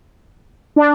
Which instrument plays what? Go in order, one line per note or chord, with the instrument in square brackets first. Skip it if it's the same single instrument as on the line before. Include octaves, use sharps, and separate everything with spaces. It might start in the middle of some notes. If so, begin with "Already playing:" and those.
[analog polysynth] D4